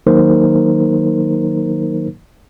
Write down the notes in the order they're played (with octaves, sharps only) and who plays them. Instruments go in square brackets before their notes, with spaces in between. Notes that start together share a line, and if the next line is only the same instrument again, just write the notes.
[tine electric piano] D#3 F#3 A#3 D#4 A#4 C5